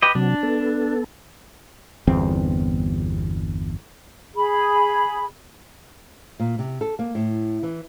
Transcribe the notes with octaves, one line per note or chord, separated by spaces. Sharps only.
G4 B4 D#5
C3 F#3 D4
B3 A4
G1 E2 C4
G#4 B5
A#2
C3
A4
A#3
A2
E3